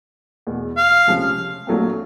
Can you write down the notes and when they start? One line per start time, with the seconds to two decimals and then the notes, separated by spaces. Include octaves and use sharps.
0.47 E2 B2 G#3
0.77 F5
1.07 C#2 C3 F3 G#3 C#4
1.67 A#1 A#2 F#3 A3 C4